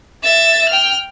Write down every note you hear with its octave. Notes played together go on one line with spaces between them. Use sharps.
E5 A6
G5 F6